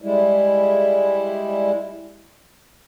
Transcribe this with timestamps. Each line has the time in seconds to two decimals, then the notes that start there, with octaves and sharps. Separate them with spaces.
0.02 G3 G#3 E4